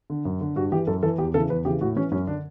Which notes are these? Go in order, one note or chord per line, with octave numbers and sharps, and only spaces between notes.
D3
F#2
D3
G2 F#4
E3 G4
F#2 A4
E3 A4
E2 G4
C#3 E3 A4
E2 B4
C#3 E3 G4
A2 F#4
E3 C#4
F#2 C#4
D3 D4